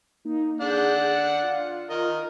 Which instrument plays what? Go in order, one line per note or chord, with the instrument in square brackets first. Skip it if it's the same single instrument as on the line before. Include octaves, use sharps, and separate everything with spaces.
[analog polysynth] A#3 D#4
[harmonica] D4 F#5 [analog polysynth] G#4 G6
[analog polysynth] C#7
F4
[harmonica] A#4 D#5